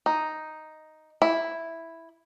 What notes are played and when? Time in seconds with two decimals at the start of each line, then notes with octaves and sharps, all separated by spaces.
0.06 D#4
1.22 E4